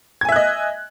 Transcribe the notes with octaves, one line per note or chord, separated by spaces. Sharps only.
D#5 E5 G#5 F#6 G#6